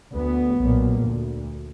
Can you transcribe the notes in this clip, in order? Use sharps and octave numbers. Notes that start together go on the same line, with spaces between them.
D2 B3
B1 A#2
D2